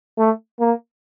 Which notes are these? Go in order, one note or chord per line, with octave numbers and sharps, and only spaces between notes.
A3
A#3